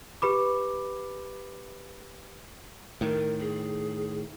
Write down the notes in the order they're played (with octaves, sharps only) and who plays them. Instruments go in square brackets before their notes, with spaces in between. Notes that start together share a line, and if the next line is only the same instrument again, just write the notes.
[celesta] G4 B4 B5 D6
[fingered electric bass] A2 D#3 [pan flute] A#4
[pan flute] G#4